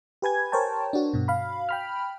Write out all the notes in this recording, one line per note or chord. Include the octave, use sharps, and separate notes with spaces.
G4 B4 G#5 G#6
A#4 C5 C#5 G5 A5
D4 F#4
G2 B2
F5 B5
G5 B5 F6